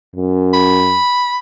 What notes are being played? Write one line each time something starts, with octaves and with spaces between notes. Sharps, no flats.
F#2
B5